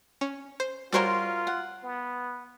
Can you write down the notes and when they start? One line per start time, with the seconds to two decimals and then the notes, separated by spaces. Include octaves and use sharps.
0.21 C#4
0.60 C5
0.93 G3 F4 F#4 A#4 C5 C#5 C6
1.47 F#5
1.83 B3